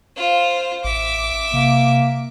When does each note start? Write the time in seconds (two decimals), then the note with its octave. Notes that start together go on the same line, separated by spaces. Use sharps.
0.16 F4 C5
0.84 A1 E5 D6
1.54 C3 A#3